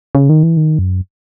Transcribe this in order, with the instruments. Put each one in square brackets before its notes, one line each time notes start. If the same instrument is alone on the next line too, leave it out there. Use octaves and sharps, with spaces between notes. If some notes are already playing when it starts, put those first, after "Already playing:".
[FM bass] C#3
D#3
E3
D#3
F#2